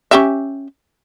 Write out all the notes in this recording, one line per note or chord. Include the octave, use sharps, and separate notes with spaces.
C#4 G4 E5